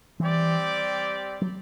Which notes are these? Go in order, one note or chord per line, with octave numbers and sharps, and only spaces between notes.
E3 G3 C4 G4 D5
F#3